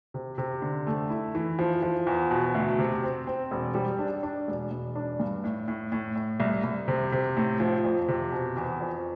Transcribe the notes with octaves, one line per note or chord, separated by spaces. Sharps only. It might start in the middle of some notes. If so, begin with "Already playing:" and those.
C3
C3
D3
A3
E4
E3
F3
F3
E2
B2
D2
C3
C4
C4
E1
G3
D4
D4
E1
E1
D4
G2
A2
A2
A2
A2
C2
C2
C3
C3
A2
F3
F2
C3
B2
E2
F2